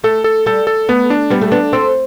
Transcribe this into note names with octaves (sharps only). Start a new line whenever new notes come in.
A3 A4
A4
G3 A4
A4
A3 B3
D4
G3 B3
A3
B3 D4
C4 A4